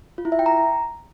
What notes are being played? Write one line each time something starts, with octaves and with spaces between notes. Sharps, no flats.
F4
E4
E5
G5
A#5